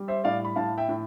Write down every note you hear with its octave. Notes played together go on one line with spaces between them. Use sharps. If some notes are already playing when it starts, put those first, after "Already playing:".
Already playing: G3
C5 E5
A2 D5 F5
B5
A2 F5 A5
E5 G5
A2